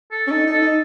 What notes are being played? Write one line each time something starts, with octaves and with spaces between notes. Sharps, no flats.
A4
C#4
D#4 A4
D#4
A4
D#4